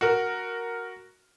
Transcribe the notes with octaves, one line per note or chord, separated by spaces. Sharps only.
F#4 A#4